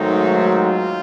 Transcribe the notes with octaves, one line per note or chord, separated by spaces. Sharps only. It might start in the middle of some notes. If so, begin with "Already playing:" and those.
Already playing: G#2 D#3 F#3 A3 C4 D#4
F4